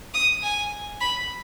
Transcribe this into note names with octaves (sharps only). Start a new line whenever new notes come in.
D#6
G#5
B5